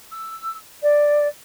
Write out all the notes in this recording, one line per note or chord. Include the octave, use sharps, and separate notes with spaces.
E6
D5